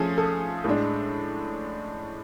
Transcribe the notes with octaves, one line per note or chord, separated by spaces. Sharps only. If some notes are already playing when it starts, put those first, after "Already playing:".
Already playing: F3 A3 C#4 G#4 A4
A4
A2 G#3 D4